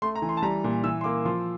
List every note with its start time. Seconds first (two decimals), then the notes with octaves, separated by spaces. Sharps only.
0.02 A3 C6
0.15 A#5
0.22 E3
0.29 C6
0.37 A5
0.42 G3 A#5
0.64 A#2
0.84 E3 E6
1.01 C6
1.04 A#3 D6
1.25 F3 C6